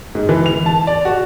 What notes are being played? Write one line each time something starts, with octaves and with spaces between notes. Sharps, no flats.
G#2
E3
F7
A5
D5
F#4